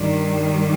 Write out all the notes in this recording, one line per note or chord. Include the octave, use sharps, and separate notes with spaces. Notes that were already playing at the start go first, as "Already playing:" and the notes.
Already playing: G2 D#3 G3